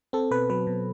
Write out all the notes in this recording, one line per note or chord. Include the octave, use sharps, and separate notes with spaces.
C4 A4
B2 B4
F#3 B4
B2